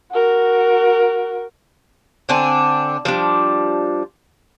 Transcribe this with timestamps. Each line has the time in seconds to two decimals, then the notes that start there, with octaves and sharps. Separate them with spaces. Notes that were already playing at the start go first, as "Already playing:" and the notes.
0.12 F#4 A#4
2.29 D3 C4 D4 G#5
3.05 F3 G3 D4